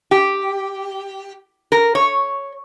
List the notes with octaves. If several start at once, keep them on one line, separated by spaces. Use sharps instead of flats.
G4
A#4
C#5